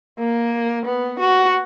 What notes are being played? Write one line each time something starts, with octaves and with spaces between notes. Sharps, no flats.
A#3
B3
F#4